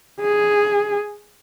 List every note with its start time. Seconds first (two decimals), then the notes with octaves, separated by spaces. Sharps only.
0.21 G#4